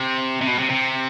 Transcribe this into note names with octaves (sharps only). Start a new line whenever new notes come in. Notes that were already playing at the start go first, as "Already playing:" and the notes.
Already playing: C3
C3
B2
C3
C3